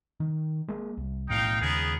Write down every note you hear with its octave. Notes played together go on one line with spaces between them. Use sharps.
D#3
G#3 A#3
C2
B1 A2 D#4 F5 G5
D#2 C#3 B3 G#4 A#4